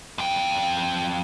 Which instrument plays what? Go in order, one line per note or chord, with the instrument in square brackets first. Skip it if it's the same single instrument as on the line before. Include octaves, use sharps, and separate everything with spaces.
[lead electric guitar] F2 G5